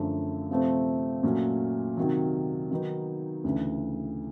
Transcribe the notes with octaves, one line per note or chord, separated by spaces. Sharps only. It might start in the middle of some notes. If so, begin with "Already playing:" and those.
Already playing: F#2 D3 F3 A3 D4
C3 F3 A3 C4
A#2 F#3 A3 C#4
C3 D#3 F#3
D#3 F#3 B3 D#4
D2 C#3 E3